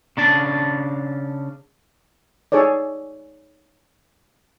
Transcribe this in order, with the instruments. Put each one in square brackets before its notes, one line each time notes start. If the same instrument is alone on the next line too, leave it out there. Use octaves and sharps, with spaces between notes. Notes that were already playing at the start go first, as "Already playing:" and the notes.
[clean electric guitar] C#3 D4 A5
[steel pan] D#4 G#4 A4 C#5 D5